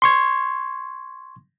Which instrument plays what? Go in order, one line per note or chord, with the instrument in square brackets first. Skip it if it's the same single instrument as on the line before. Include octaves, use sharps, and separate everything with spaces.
[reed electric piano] C6 C#6 G#6